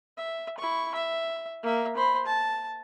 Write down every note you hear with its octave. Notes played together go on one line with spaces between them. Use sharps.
E5
E4 C#6
E5
A#3 E5
C5 B5
A5